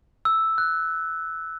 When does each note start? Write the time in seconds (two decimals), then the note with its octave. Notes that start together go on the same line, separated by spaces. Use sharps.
0.25 E6
0.58 F#6